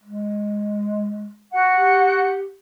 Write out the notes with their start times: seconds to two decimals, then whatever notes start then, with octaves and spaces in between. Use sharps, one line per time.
0.03 G#3
1.51 F#4 F#5
1.75 G4